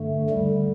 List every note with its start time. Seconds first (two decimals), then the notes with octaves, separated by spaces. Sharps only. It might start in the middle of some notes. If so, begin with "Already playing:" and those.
Already playing: G2 D3 A3
0.30 D2 D3 G3